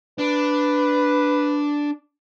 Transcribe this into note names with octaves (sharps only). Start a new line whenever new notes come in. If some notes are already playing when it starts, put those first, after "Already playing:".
D4 B4